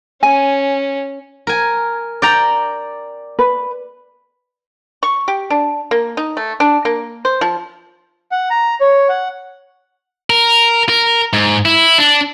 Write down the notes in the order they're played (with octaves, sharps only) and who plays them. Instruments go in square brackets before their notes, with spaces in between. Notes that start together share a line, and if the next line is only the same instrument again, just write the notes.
[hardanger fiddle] C#4 [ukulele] G#5
[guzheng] A#4 G#5
D5 G5 A#5
[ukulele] B4
[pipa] C#6
G4
D4
A#3
D#4
A3
D4
A#3
C5
F3
[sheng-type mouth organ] F#5
A#5
C#5
F#5
[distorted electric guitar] A#4
A#4
G#2
E4
D4